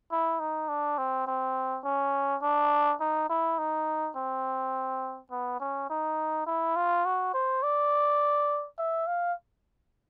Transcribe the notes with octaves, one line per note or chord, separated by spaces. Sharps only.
E4
D#4
D4
C4
C4
C#4
D4
D#4
E4
D#4
C4
B3
C#4
D#4
E4
F4
F#4
C5
D5
E5
F5